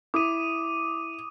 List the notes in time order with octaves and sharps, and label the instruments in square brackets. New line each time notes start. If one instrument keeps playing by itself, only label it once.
[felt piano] E4 [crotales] D6 D#6 D#7